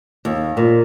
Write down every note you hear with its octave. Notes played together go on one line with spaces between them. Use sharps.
D#2
A#2